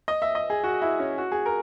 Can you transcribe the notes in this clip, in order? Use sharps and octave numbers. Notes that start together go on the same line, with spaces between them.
D#5
E5
D#5
G#4
F#4
E4
C#4
F#4
G#4
A#4